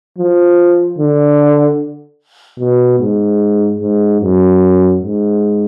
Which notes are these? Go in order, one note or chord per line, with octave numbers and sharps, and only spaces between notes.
F3
D3
B2
G#2
G#2
F#2
G#2